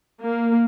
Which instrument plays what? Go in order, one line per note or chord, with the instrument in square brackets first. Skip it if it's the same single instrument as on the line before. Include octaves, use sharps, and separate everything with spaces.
[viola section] A#3